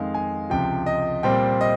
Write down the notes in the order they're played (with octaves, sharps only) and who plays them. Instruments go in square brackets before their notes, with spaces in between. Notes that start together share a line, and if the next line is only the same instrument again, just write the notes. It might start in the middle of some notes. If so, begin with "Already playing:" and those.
Already playing: [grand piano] F2 D#3 G#3 F5
G#5
C#2 C3 F3 G5
D#5
A#2 G3 C4 G5
D#5